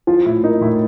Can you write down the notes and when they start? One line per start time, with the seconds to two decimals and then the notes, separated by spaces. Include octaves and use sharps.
0.07 F3 F4
0.26 A2 E4
0.43 A#3 D#4
0.61 A2 E4